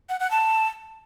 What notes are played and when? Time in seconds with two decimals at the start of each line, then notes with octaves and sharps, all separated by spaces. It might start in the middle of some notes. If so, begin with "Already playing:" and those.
0.09 F#5
0.20 F#5
0.31 A5